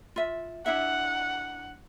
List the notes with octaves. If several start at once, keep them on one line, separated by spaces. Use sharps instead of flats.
F4 E5
D4 E4 E5 F#5